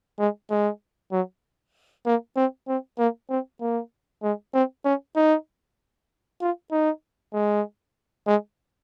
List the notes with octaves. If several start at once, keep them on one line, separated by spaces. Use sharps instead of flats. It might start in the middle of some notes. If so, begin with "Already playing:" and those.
G#3
G#3
F#3
A#3
C4
C4
A#3
C4
A#3
G#3
C4
C#4
D#4
F4
D#4
G#3
G#3